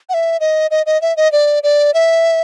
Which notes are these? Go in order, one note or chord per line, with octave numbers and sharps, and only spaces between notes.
F#5
E5
D#5
D#5
D#5
E5
D#5
D5
D5
E5